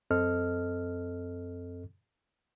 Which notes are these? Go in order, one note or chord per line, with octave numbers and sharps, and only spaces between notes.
F#2 C4 A4 D#5 F6